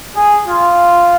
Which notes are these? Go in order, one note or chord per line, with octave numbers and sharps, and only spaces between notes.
G#4
F4